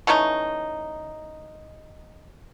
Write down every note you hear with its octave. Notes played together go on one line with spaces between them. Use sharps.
E3 A3 C#4 D#4